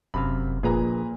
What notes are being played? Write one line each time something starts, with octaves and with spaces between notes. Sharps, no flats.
F1 F#2 C3 F5 B5
A#1 A#2 G#4 B4 A#5